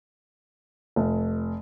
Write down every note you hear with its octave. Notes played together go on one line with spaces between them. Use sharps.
F1